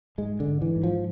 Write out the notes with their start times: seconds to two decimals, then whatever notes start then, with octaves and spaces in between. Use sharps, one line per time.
0.18 G#2 G#3
0.40 D3
0.48 G#2
0.62 E3
0.76 G#2
0.83 F3